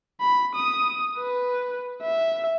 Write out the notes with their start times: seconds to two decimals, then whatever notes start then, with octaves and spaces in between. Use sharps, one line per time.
0.20 B5
0.55 D#6
1.18 B4
2.02 E5